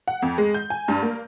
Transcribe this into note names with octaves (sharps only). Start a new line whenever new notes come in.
F#5
F2
G#3
G6
G#5
G2
A#3